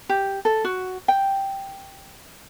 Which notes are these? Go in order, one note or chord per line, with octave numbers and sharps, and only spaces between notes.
G4
A4
F#4
G5